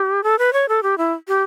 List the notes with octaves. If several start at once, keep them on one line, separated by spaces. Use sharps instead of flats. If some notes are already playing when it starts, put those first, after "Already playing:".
Already playing: G4
A4
B4
C#5
A4
G4
E4
G4